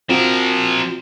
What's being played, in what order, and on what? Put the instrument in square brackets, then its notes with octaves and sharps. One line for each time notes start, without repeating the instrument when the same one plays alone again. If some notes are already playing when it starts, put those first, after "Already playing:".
[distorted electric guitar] F3 A#4 [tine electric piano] C4 F4 F#4